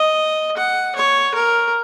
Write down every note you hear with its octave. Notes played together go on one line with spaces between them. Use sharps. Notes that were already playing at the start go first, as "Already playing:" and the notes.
Already playing: D#5
F#5
C#5
A#4